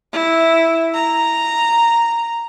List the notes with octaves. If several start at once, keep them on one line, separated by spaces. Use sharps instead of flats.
E4
A#5